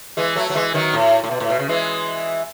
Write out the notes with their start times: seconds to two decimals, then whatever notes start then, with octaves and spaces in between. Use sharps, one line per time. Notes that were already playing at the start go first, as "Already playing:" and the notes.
0.17 E3 G#3
0.36 F#3 A3
0.50 F#3
0.55 E3 G#3
0.74 D#3 F#3
0.93 A2
1.24 A2
1.31 B2
1.40 A2
1.50 B2
1.59 C#3
1.69 E3 G#3